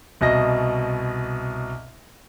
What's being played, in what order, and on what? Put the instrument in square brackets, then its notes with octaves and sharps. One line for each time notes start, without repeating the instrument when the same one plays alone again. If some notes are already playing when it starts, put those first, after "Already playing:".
[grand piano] C2 B2 D#5 A#6